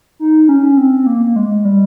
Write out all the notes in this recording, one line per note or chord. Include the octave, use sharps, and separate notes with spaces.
D#4
C#4
C4
C4
A#3
A#3
G#3
G3